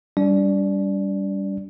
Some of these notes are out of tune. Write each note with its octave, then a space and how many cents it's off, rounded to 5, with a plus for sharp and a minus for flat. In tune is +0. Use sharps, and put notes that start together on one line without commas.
G3 +0 D4 -40 D5 +0